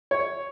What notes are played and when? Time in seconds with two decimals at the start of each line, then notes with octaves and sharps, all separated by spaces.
0.11 C#5